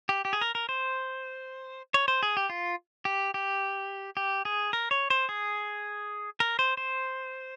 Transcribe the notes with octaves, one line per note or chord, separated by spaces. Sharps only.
G4
G4
G#4
A#4
A#4
C5
C#5
C5
G#4
G4
F4
G4
G4
G4
G#4
A#4
C#5
C5
G#4
A#4
C5
C5